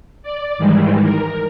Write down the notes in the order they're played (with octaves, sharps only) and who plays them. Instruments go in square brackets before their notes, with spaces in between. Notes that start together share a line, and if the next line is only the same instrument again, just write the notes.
[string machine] D5
G#2 D#3 E3 G3 G#3
A#4